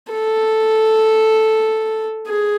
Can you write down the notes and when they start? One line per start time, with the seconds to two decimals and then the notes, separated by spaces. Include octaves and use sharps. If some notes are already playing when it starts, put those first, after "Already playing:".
0.13 A4
2.28 G#4